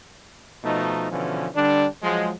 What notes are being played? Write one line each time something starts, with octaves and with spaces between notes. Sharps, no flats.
B2 F3 A3 D#4
B2 D3 E3 F3 C#4
D3 G3 D4
F3 F#3 G#3